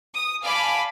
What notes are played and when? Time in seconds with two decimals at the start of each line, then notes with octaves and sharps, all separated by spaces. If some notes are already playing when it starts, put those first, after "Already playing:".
0.15 D#6
0.43 D5 F5 G#5 A5 B5 D6